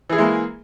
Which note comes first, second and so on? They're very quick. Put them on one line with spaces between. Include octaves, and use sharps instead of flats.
E3 G#4 E4 G#3 A#3